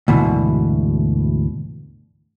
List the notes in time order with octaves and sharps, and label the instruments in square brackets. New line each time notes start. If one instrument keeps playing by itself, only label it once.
[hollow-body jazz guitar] D2 G#2 B2 E3